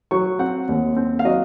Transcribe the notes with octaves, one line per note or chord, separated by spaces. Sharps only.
F#3 C#6
C4 F#5
D#2
C4
F5
F#3 D#5